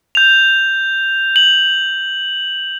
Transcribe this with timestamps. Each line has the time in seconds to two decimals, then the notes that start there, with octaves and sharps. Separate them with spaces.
0.15 G6 F7
1.36 F#7